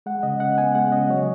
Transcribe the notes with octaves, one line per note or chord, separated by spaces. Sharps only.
G#3 F#5
C#3 D#5
C#3 F#5
B3 G#5
G#3 F#5
C#3 D#5
F#3 C#5